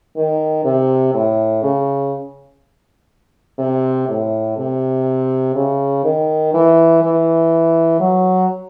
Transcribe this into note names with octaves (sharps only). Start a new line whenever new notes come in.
D#3
C3
A2
C#3
C3
A2
C3
C#3
D#3
E3
E3
F#3